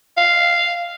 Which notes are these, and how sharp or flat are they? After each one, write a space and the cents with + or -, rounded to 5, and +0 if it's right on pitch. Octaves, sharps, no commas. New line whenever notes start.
F5 -5